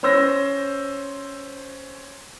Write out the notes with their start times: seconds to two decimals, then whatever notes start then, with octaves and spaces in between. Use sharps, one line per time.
0.03 C#4 C5 E6 A#6